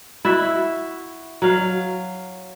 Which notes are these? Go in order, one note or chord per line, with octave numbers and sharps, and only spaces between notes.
E4 F#4 E5
F#3 F5